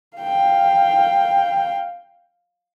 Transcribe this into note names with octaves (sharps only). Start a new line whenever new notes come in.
F5 G5